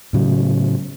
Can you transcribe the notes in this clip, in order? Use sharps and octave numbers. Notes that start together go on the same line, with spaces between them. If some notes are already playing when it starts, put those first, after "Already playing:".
A2 C#3 F#3